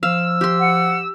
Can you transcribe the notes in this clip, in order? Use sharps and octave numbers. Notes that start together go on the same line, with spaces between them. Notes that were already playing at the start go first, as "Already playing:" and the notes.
F3 F5 E6
G4 C6
F#5